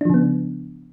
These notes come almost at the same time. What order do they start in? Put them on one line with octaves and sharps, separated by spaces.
D4 F3 C#3 B3